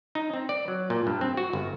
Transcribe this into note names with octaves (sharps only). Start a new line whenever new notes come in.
D#4
C4
D5
F#3
A#2
G2
C4
F#4
G1